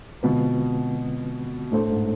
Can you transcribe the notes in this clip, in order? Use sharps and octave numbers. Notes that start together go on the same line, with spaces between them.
B2 D3 G#3 C4 F4 B4
A2 A3 D4 A4 C5
G#2